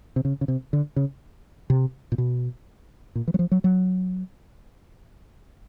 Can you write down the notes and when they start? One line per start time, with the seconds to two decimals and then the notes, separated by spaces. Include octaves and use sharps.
0.16 C3
0.25 C#3
0.41 C#3
0.48 C3
0.73 D3
0.96 C#3
1.70 C3
2.12 A#2
2.18 B2
3.15 A#2
3.28 E3
3.34 F#3
3.39 F3
3.52 F#3
3.64 F#3